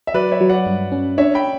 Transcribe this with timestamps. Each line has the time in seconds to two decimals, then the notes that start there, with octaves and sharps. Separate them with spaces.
0.07 E5
0.14 F#3 B4 D5
0.32 C#5 E5
0.41 F#3
0.49 D5 F#5
0.66 G2
0.92 C#4
1.17 D4 C#5 E5
1.35 G5 B5